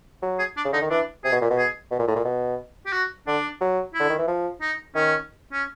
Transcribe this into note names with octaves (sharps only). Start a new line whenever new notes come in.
F#3
G#4
D4
C#3
D3 D#4
D#3
E3 D4
C3 G#4
B2
A#2
B2
G#4
B2
A#2
A2
A#2
B2
G4
F#4
D3 D4
F#3
E4
D3
D#3
E3
F3
D#4
D#3 C#4
C#4